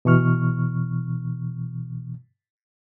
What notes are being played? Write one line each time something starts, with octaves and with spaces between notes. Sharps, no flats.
B2 E3 C#6 F6